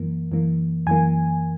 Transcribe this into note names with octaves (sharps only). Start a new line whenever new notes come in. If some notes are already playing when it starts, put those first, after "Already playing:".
Already playing: F#2 E3 A#3
F#2 E3 A#3
F#2 E3 A#3 G#5